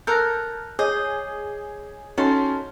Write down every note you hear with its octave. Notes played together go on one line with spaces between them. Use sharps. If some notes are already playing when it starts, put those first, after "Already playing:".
A4 A#4 E6 F#6 G6 A#6
G#4 C#5 D#5 D6 G6
C#4 D#4 F#4 A4 C6